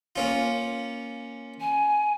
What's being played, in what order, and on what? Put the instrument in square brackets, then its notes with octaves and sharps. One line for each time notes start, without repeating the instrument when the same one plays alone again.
[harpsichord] A#3 C#4 F4
[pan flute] G#5